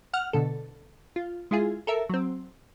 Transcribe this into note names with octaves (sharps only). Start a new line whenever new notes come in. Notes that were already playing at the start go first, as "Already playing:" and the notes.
F#5 F6
B2 D3 A4
F4
G#3 E4 F4 G#4
A4 A#4 E5
F#3 C4